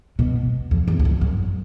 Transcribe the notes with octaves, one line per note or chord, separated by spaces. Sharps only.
B2
F2
E2
E2
F2
F#2